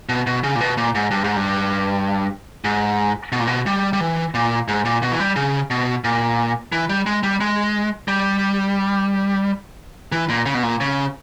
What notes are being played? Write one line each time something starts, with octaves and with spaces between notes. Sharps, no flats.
B2
B2
C#3
A#2
B2
A#2
G#2
G2
G#2
G2
G#2
B2
A#2
B2
G3
G3
E3
A#2
G#2
A#2
B2
E3
G3
C#3
B2
A#2
E3
G3
G#3
G3
G#3
G3
E3
A#2
C#3
B2
A#2
C#3